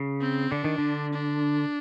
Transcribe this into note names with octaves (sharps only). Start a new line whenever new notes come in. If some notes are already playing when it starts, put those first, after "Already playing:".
Already playing: C#3
C4
D3 D4
D#3
D3
D4